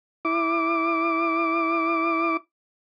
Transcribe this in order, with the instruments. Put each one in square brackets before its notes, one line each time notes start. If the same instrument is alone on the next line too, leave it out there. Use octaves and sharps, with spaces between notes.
[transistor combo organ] E4 D6